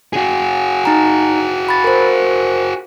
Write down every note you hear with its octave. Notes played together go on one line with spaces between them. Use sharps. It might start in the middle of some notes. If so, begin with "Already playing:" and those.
F#4 G#4
D#4 A#5
B5 A6
A#4 C5